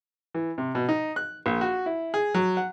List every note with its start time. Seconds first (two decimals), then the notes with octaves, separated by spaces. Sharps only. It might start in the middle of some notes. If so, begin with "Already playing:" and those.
0.34 E3
0.58 C3
0.75 B2
0.89 D#4
1.16 F#6
1.46 A#1
1.61 F#4
1.86 E4
2.14 G#4
2.34 F#3
2.57 F#5